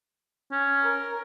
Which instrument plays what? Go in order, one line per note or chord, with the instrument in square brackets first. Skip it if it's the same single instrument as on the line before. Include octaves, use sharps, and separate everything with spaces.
[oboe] C#4
[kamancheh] A#4